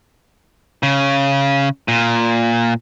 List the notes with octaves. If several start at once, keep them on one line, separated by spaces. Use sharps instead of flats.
C#3
A#2